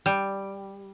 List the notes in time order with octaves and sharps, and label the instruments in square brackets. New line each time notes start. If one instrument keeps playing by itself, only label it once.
[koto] G3